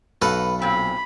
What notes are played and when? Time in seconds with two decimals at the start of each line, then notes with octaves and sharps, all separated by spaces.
0.22 B1 F#4 A4 B4 F5
0.62 A#2 C4 B5